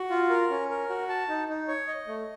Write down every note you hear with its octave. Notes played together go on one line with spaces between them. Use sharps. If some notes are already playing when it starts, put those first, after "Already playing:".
Already playing: F#4
F4
A#4
C#4
A#4
F#4
A5
D#4
D#4
C#5
D#5
A3